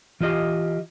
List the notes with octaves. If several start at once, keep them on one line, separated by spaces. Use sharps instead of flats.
E3 F4 G4 D#5 F5